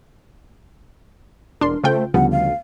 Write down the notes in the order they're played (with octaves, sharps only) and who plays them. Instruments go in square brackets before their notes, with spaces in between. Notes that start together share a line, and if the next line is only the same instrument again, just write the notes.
[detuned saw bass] E1 [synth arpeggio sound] D4 C6 [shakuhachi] A#4
[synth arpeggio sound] C#3 F4 G5 [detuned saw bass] A3 [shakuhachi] C5
[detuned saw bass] D2 [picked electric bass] C#3 F3 G3 [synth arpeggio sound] B3 [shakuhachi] F#5
[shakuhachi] F5